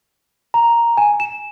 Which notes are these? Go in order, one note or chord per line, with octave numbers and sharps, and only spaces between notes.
A#5
G#5
E7